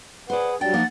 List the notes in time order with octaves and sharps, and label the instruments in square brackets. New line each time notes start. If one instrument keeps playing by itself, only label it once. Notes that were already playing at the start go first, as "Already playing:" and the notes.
[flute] G#4 [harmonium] B4 F#5 [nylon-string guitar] C5 D5
[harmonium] F#3 G3 D4 [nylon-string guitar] G5 [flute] A6
[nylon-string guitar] F3 A#3 D#4 [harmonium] F#5